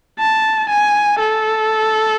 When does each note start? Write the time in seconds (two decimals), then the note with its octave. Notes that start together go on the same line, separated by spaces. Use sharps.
0.19 A5
0.69 G#5
1.19 A4